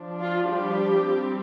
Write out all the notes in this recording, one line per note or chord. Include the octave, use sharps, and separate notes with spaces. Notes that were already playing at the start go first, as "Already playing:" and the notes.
Already playing: F3 D4
F4
G3 G4
G3 C4